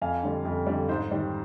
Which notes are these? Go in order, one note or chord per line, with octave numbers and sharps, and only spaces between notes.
F2 F5 G#5
D3 G3
F2
D3 G3
G#2 C5
D#3 G3